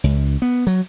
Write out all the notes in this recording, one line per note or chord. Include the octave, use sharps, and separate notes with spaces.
C#2
B3
F#3